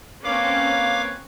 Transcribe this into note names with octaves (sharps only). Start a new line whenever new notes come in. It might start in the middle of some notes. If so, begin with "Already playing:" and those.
A#3 C4 C#4 B4 C#5 F5 D6